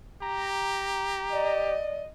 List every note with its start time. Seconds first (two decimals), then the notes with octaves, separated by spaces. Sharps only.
0.22 G4 A#5
1.32 D5 D#5